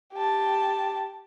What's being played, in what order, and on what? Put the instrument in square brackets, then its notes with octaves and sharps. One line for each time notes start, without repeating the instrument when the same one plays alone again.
[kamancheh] G4 A5